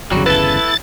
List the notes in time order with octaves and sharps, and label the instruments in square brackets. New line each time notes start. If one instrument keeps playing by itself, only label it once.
[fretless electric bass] G1 E2 C#3 [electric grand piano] F#3 [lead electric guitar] G3 F#4
[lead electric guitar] E4 A4 [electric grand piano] B4 [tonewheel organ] A6